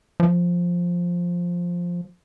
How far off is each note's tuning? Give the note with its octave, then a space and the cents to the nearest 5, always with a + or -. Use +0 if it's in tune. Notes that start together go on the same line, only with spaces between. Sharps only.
F3 +5